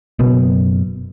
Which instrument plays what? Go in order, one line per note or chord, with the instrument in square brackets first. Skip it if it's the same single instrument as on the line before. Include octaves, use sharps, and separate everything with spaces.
[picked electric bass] F#1 F#2 B2